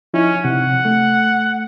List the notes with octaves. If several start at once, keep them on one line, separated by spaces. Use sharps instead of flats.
F3 C#4 D#4 E4
C3 F#5
A3